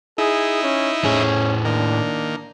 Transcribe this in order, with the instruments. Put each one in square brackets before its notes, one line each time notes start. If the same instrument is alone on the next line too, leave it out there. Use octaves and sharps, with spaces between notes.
[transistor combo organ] D#4 E4 [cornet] G#4
[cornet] C#4
[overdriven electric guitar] A2 G#4 [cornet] C#4
[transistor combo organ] D#3 A#3 [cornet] D4